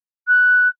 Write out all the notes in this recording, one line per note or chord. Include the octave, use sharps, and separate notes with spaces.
F#6